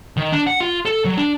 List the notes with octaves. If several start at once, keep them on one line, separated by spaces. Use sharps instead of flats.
D#3
D4
F#5
F4
A4
F#3
D4